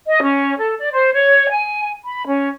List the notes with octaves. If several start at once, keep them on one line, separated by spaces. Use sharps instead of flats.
D#5
C#4
A4
D5
C5
C#5
G#5
B5
C#4